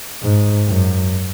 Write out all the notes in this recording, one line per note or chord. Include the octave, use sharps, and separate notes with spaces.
G#2
F#2